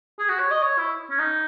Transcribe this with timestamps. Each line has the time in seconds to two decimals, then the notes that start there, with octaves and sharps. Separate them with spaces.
0.19 G#4
0.29 F#4
0.40 C#5
0.51 D#5
0.62 C#5
0.79 E4
1.10 C#4
1.19 D#4